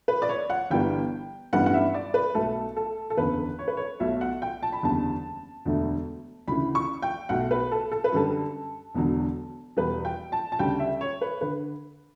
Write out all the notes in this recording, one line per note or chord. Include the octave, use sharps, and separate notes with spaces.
B4
D5
C#5
F#5
G1 G2 E3 G3 B3 G5
A1 G2 E3 G3 B3 F#5
F#5
E5
D5
B4
B1 B2 A3 A4
A4
A4
F#1 E2 D3 B4
C#5
B4
C#5
B1 B2 A3 E5
F#5
G5
A5
B5
F#1 E2 D3 G3 A5
E1 D2 D3 A3
D2 C#3 E3 B5
C#6
G5
B1 B2 A3 F#5
B4
A4
A4
B4
F#2 D3 G3 A4
E1 E2 D3 F#3
E2 B2 G3 B4
G5
A5
A5
D2 C#3 G3 G5
E5
C#5
B4
D3 B4